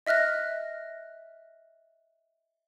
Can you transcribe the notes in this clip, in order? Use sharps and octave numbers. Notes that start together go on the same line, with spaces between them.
D#5 E5 F6 F#6 A#6